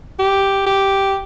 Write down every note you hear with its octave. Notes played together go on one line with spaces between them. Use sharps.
G4
G4